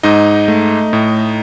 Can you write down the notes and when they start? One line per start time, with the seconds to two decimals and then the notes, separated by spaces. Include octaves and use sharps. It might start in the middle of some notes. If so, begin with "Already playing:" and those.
0.03 G#2 D#4 D#5
0.48 A3
0.93 A2